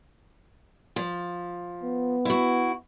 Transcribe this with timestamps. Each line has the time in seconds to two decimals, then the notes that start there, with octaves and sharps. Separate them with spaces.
0.96 F3
1.83 B3
2.25 E4 F#4